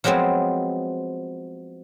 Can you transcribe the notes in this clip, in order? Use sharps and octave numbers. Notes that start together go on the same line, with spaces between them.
F3 F#3 G#3 B3 C4